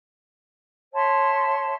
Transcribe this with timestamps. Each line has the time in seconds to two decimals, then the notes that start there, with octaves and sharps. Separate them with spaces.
0.93 C#5 E5 A5 C6